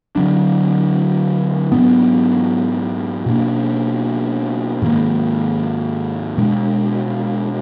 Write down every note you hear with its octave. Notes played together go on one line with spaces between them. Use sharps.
D3 F#3 D4
G#2 F#3 B3 D4
B2 A#3 D4
G#2 D#3 A#3
B2 G#3 D4